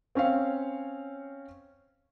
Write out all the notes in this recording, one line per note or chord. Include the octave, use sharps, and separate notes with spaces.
C4 C#4 C#5 F5